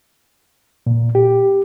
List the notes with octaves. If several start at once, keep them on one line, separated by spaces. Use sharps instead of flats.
A#2
G4